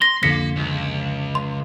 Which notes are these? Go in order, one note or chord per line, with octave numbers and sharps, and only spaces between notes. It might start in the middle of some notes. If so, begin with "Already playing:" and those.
C6 A#6
C2 F2 D3 A#3 A#6 B6 C#7
C#2
C6